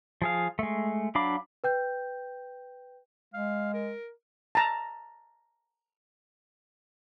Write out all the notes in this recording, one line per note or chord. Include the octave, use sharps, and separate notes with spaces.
F3 G#4 F5
G#3 A3
F#3 D4 F5 B5 D6
B4 G5 G6
G#3 F5
A#4
A5 A#5